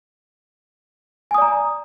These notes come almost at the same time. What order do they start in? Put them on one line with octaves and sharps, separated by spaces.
G#5 D#6 D5 A#5